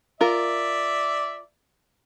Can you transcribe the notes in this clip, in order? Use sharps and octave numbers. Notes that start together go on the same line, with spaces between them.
F4 A#4 D5 E5